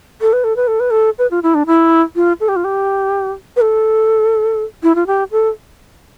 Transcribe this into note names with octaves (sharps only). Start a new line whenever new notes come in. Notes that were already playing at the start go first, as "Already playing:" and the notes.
A4
B4
A4
B4
A4
B4
A4
B4
F4
E4
D4
E4
F4
A4
G4
F4
G4
B4
A4
E4
F4
G4
A4